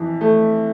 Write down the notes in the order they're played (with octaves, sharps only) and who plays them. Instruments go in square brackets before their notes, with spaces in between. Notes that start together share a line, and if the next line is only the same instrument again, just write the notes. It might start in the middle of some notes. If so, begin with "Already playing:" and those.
Already playing: [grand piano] F2 E3
[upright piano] A3